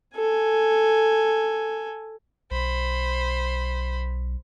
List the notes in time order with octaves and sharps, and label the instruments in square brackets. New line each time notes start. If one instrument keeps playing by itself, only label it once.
[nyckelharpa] A4 G#5
[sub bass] B1 [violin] C5 B5